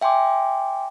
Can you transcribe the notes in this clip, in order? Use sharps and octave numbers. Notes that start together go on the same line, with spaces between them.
E5 G5 G#5 C6 D6